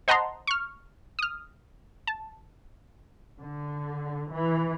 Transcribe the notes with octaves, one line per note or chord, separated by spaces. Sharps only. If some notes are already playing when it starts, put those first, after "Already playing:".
C5 D#5 F#5 A5 A#5 C6
C#6 F6
D#6 F6
A5
D3
E3